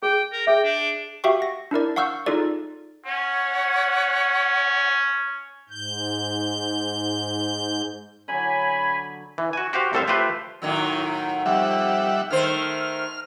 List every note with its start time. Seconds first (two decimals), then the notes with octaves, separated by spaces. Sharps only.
0.03 G#4 G5
0.32 A#4
0.47 G#4 E5 G5
0.64 D4
1.24 F#4 G4 E5 F5 G5 C#6
1.40 F#5 A#6
1.71 D4 E4 A#4 D5
1.96 F5 F#5 C#6 E6 F6 G6
2.26 D#4 F4 G#4 A4 D5
3.06 C#4 C#5 F#5
5.69 G#2 G6
8.28 D3 F#3 G#5 B5
9.38 E3
9.53 F#4 G#5
9.73 F#4 G4 C5 F5
9.93 C2 A2 A4 C5 E5 F5
10.08 A3 F4 G4 B4 C5 E5
10.62 A2 D#3 F#3
11.46 F2 G3 E5 F#5
12.31 D#3 A3 C5 F6